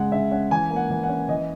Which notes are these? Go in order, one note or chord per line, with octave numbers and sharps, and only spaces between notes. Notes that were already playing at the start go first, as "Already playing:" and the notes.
Already playing: C#3 G#3 F#5
C#3 E5
C#4 F#5
E3 G#5
A#3
F#5
E3
F#5
C#4
E3 D#5